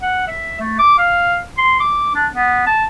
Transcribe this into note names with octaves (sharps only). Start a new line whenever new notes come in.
F#5
E5
A3
D6
F5
C6
D6
D4
B3
A5